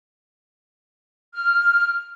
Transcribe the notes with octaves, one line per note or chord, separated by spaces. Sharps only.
F6